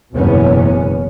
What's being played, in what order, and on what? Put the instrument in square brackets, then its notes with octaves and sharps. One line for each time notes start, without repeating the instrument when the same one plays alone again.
[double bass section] F#1 E2 B2 B3 C#4